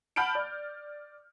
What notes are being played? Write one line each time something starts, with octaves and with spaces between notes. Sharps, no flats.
F#5 A5 B5 F6 G6 D7
D5